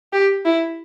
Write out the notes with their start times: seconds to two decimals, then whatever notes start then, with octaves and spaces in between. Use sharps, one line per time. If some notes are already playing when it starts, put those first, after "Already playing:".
0.13 G4
0.45 E4